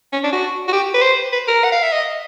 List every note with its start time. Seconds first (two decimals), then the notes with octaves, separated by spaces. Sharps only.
0.13 C#4
0.23 D4
0.33 F#4
0.68 F#4
0.73 G4
0.94 B4
1.02 C5
1.33 B4
1.48 A#4
1.64 F#5
1.72 F5
1.83 E5
1.92 D#5